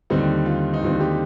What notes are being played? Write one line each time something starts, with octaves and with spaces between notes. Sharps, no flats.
D#2 D3 G3 C4 D#4
F4
D#4
D#2 D3 G3 C4 F4
G3 G4